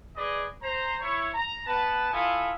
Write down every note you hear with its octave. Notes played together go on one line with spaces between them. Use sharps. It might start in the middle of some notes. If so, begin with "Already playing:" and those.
G#4 B4 D5 D#5
C5 A#5
E4 C#5
A#5
B3 B4 A5
E4 F4 A4 F5 G#5 D#6